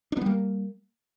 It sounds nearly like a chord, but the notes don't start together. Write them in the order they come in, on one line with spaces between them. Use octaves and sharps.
D4 B3 G3 A#3